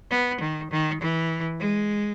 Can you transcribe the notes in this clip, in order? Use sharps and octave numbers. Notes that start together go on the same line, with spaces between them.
B3
D#3
D#3
E3
G#3